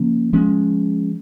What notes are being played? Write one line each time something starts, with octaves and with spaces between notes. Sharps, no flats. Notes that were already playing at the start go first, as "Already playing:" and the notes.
Already playing: C#3 F3 A#3 C#4
F3 G#3 C#4